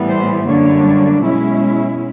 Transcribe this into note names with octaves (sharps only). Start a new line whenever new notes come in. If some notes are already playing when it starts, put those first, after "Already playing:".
Already playing: A2 E3 G3 B3
C5
F#2 D3 G3 A#3 D4 C#5
B2 G#3 C#4 E4